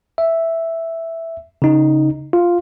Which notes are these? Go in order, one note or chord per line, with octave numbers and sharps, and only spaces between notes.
E5
C#3 D#4
F4